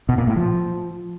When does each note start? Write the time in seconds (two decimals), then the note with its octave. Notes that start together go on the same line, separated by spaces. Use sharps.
0.09 B2
0.18 A#2
0.27 A2
0.36 F3